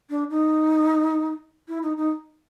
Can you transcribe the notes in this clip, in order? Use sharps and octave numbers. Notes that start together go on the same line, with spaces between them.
D4
D#4
E4
D#4
D#4